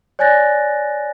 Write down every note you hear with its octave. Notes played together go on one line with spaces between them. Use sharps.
C#5 D5 G#5 F#6 A6 A#6